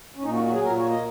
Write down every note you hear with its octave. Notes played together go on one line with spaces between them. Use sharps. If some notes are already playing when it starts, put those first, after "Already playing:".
C#4
A#2 D#4
F#4
F#3 F#4
G#4
A#2 A#4
C#5
A#3
D#5